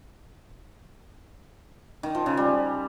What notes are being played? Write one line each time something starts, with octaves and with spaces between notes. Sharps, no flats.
D#3
F3
C#3
G3